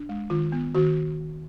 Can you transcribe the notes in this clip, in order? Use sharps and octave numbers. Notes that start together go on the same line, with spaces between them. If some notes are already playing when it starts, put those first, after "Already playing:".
Already playing: D4
G#3
D#3 F4
B3
D#3 F#4